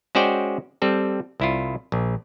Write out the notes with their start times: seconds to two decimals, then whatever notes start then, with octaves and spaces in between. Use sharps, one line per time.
0.15 G#3 C#4 F#4 C5 D5 G5
0.82 G3 C4 A4
1.40 C2 E4 F4
1.92 A#1